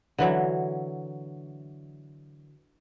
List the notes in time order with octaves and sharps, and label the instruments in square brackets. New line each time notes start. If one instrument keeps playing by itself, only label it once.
[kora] D3 E3 F#3